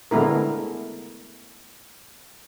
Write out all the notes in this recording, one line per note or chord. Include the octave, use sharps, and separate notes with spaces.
D3 G#3 A3 B3 E4 A#4